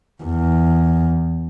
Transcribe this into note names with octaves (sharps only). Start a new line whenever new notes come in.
E2